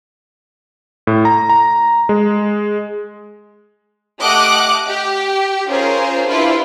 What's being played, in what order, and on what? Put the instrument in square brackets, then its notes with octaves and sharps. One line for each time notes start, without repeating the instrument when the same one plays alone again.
[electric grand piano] A2
A#5
A#5
G#3
[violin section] A3 G4 D#5 F#5 D6 F#6
G4
C#4 F4 G#4 A#4 C5 C#5
D4 E4 F4 G4 B4 C5